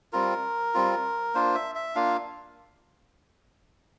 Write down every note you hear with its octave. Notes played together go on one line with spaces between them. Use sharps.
G3 C4 F4 A#4
G3 C4 F4
A#3 D4 F4 C5
E5
E5
A#3 D4 F4 F5